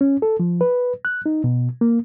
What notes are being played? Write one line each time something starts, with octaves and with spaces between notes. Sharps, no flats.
C#4
A4
F3
B4
F#6
D#4
B2
A#3